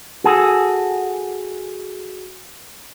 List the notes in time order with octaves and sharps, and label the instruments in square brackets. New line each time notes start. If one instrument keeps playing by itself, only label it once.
[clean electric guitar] F#4 G#4 A4